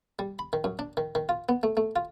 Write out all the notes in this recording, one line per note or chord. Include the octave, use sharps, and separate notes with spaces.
G3
B5
D#3
F#2
D4
D#3
D#3
F4
B3
A3
A3
F4